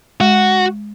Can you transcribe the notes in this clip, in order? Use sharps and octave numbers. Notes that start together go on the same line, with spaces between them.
G#3 F#4